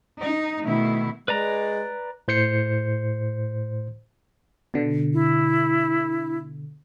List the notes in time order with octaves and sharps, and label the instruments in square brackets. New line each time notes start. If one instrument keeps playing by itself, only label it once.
[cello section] D#4
B2 D#3 A3 E4
[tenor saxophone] G#3 [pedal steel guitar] B4 D5 A#5
[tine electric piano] A2 C5 G6 C7 C#7
[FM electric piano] B2 D3
[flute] E4